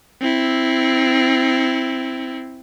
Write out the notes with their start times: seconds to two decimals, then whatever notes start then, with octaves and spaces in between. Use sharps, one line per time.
0.21 C4 E4